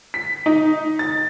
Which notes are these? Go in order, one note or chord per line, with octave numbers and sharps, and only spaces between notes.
B6
D#4
A6